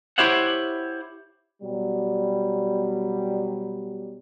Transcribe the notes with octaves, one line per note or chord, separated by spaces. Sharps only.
E4 G4 C5 C#5 E5 F#5
B2 F#3 G3